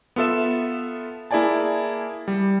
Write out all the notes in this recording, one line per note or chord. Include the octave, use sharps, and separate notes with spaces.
B3 F4 A4 E5 E7
A#3 E4 G#4 D5 G#5 A5
G3